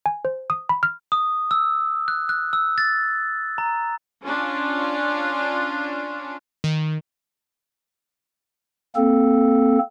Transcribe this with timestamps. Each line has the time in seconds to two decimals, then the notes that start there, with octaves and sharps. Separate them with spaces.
0.06 G#5
0.25 C5
0.50 D#6
0.69 B5
0.83 F6
1.12 D#6
1.51 E6
2.08 F#6
2.29 F#6
2.53 E6
2.78 A6
3.58 A#5
4.24 C#4 D4 F4
6.64 D#3
8.96 A#3 C4 A4